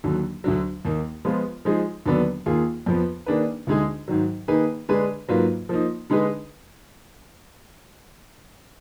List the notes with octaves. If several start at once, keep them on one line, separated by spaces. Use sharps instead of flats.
D#2 D3 F#3
D2 D3 F#3
D#2 D#3 A#3 D#4
F3 G#3 B3 F4
F3 G#3 D#4 G#4
D#2 D3 F#3 B3 D4
D#2 D#3 A#3 F4 G#4
F2 F3 B3
D#3 A#3 D4 G#4 B4
D2 D3 G#3 D#4 G#4
G#2 D#3 F#3
D#3 A#3 D#4 G#4 B4
D3 G#3 D4 G#4 B4
G#2 F#3 A#3 F4 B4
F3 A#3 D#4
D3 G#3 D#4 G#4 B4